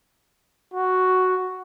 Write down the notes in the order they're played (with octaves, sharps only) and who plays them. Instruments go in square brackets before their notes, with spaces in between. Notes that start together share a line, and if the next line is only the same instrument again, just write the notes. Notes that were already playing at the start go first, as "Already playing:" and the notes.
[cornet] F#4